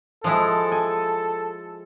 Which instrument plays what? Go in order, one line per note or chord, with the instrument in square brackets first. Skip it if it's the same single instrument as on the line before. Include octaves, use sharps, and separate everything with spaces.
[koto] F3 G#3 E4 [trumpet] A4
[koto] G#5